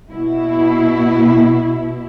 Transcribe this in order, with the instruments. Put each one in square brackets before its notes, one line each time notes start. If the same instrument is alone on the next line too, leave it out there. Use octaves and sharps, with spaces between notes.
[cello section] B2 E4